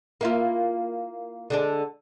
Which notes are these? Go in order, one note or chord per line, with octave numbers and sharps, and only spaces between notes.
A#3 E4 F4
D3 G#3 D4